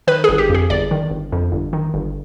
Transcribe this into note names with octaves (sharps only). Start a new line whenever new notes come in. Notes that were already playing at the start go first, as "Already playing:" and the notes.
D#3 B4
G1 G#4
G4
F2 G#4
G1 D5
D#3
G1
F2
G1
D#3
G1